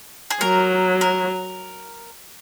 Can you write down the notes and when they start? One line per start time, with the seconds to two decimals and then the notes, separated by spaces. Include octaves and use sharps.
0.31 G#4
0.41 F#3 A#4
1.01 A#4